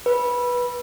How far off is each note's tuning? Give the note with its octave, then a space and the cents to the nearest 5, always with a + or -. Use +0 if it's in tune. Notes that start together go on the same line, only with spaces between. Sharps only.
B4 -15